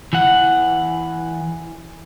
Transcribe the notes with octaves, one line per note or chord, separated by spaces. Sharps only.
E3 F#5